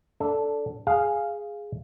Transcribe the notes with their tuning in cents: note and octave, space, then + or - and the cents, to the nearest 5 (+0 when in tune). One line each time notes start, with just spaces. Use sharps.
D4 -15 A4 +0
G#4 +0 F5 +0